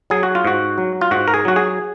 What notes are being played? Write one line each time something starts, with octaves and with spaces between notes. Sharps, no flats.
F#3 G#4
F#4
F4
G#2 F#4
F#3
F4
G#2 F#4
A#4
G#4
F#3 F#4
G#4